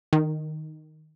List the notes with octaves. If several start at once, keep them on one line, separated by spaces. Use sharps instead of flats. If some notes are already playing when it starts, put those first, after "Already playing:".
D#3